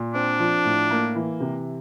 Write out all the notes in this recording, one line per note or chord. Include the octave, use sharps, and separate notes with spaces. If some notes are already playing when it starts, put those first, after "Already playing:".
Already playing: A#2
C4 D4
F3
A2
A#3
E3
C3